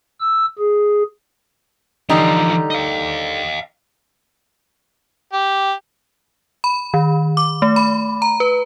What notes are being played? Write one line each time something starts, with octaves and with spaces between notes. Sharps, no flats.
E6
G#4
D3 E3 F3 G3 D#4
D#5 F5
G4
B5
D#3
D6
A3
B5
A#5
B4